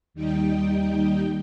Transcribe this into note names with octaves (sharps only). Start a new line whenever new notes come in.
D#2 G3 D#4 G5